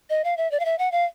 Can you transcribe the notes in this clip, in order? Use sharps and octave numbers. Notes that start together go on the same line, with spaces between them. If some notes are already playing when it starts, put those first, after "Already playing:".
D#5
F5
E5
D5
F5
E5
F#5
F5